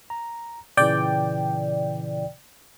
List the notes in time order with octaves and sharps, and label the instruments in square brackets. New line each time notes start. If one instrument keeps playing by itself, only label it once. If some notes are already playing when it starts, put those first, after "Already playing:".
[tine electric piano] A#5
[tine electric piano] A#2 C#3 E3 [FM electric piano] D5 G5